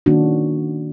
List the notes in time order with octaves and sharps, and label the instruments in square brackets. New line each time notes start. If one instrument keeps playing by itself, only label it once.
[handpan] D#3 A#3 C#4 D4 F#4